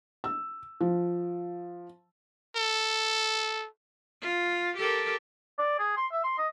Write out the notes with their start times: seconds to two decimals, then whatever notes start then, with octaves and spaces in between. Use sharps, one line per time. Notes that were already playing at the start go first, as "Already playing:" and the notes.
0.24 E6
0.81 F3
2.56 A4
4.22 F4
4.77 G4 A4 A#4
5.59 D5
5.79 G#4
5.97 C6
6.12 E5
6.24 C6
6.38 D#5